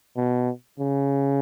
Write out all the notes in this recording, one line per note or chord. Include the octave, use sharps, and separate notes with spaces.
B2
C#3